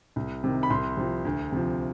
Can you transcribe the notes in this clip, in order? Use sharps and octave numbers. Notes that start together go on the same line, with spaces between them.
C2
C3 D#3
B5
C2 C6
C3 F3
D2
C3 F3